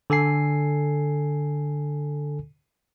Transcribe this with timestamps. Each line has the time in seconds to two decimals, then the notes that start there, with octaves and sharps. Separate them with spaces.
0.10 D3 A4 G#5 C7